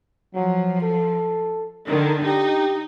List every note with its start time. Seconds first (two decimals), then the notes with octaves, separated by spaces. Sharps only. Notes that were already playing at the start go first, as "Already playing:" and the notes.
0.35 F3 F#3
0.82 A4
1.86 D3 D#3
2.24 D#4 G4